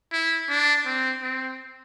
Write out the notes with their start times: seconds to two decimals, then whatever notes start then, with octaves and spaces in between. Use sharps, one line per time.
0.12 E4
0.49 D4
0.86 C4
1.23 C4